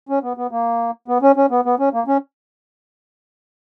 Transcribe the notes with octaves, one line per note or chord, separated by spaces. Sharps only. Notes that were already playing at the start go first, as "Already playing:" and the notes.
C#4
B3
B3
A#3
B3
C#4
C#4
B3
B3
C#4
A#3
C#4